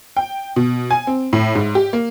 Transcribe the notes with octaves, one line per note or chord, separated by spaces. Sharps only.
G5
B2
G#5
C4
A2
G#2
G4
A#3